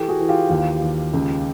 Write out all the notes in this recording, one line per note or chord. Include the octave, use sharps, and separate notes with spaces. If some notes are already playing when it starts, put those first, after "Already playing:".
Already playing: E3 G4 A4
F#4 G#4
E3
F4 G4
D#2
D#2
C#2